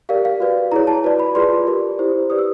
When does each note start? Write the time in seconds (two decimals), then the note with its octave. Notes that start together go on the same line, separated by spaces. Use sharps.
0.09 G4 A#4 D5 F5
0.25 F5
0.40 F#4 B4 D5
0.72 E4 G#4 C#5 A#5
0.87 A5
1.04 F#4 B4 D5
1.20 B5
1.35 F4 G#4 B4 D5 C6
1.67 G4 A#4 D5
1.99 E4 G4 C5
2.30 G4 B4 D5 D#6
2.39 E6